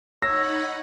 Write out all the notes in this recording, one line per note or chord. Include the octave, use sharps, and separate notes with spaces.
D#4 C#5 F#5 B5 E6 A#6